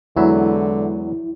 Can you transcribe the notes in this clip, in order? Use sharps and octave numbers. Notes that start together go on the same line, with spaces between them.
E2 D3 F#3 G#3 E4 E5